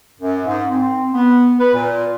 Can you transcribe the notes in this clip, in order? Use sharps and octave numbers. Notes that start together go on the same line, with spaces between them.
F#2
G#2
C4
B3
B4
A#2